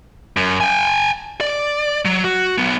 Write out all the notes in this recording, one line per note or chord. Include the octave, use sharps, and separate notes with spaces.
F#2
G5 G#5
D5
F#3
F#4
F#3 B3